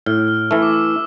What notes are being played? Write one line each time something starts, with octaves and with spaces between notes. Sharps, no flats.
A2 F6
F6
E3 A3 E6
D6
E6